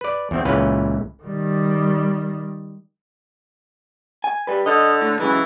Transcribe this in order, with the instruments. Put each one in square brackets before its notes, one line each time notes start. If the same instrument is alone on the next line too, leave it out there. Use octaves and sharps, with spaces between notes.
[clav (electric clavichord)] B4 D5
E2 C4
C#2 A#2 E3 C#4 B4 F5
[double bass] D#3 G3
[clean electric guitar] G#5
G3 B4
[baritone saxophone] D3 [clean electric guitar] D#5
[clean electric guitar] A2
[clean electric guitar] C#3 F#3 G#3 [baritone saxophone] E3